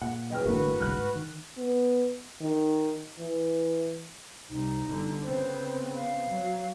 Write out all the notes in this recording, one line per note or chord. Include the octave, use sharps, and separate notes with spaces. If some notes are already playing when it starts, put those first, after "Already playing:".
A#2 F#5
C#3 E3 F#3 D#5 G5 F6
G1 A2 D3 G#3 A#3 F#4 B4
G1 C2 G2 F6 F#6
G#2
D#3
B3
D#3
E3
C2 D#4
G1 D3
C#3 B3 C4 C5
F5
F#3